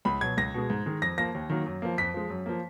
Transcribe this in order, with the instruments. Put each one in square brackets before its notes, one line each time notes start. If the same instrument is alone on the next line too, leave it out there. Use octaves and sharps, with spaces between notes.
[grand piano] C#2 B5
B2 F#3 G#6
C#2 A#6
B2 G#3
G#2
D#3 G#3
F2 A#6
F3 A#3 A#6
D#2
D#3 F#3 A#3
F#2
F3 A#3
F2 B6
F3 G#3
F#2
F3 A#3